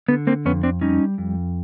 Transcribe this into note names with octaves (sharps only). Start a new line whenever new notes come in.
D3 B3
A#3 C4
F2 B3 C#4
C4 D4
G3 C#4 D#4
F2